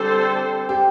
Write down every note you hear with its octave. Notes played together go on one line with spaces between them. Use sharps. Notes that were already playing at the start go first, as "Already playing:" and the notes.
Already playing: D3 G3 C4 G4 A4 C5
G4